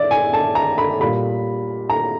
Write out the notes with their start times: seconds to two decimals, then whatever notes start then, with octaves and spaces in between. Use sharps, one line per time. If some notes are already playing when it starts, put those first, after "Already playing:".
Already playing: D5 E5
0.11 G#5
0.33 A5
0.55 A#5
0.78 B5
1.00 A#2 G3 B5
1.90 A#5